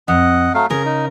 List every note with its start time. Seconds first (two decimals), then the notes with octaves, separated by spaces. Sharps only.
0.08 F2 D#5 F#5
0.54 F#3 A3 F5
0.70 C#3 G#4 A#4
0.85 D#4